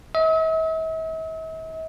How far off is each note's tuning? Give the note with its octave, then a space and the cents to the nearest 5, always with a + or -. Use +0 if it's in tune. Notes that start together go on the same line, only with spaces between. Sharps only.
E5 -45